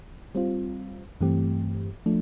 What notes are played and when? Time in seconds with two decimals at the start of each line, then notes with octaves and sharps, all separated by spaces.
0.35 G3 C4 F4
1.21 G2 E3 A3 C4 G4
2.06 F3 A3 D4